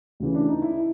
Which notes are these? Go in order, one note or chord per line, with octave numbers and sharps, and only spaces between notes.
D2 C#3 E3
D4
D#4
E4